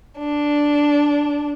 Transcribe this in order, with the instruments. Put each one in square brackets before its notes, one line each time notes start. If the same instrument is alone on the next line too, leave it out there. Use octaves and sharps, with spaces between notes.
[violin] D4